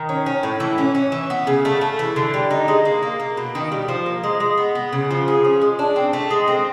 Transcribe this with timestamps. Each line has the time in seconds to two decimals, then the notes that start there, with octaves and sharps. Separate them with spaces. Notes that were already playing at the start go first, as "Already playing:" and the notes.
Already playing: D#3
0.09 C#4
0.26 C#4
0.43 A2
0.60 E3
0.78 C#4
0.95 C#4
1.12 E3
1.30 B3
1.47 C#3
1.65 A3
1.81 A3
1.99 E3
2.16 D3
2.34 G3
2.51 D#4
2.68 G#3
2.85 A#3
3.03 A#3
3.20 A#3
3.37 B2
3.55 D#3
3.72 G3
3.88 F3
4.06 A#3
4.23 G#3
4.40 G#3
4.58 B3
4.75 B3
4.93 C#3
5.11 F3
5.28 G#4
5.45 C#4
5.62 G#3
5.79 D4
5.96 C4
6.13 A3
6.31 G#3
6.48 C4